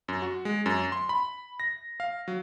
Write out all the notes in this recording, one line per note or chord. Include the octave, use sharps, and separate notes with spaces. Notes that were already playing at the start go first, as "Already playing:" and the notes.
F#2
F#4
G#3
F#2
C6
B5
A#6
F5
F#3